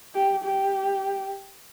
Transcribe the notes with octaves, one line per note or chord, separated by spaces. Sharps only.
G4
G4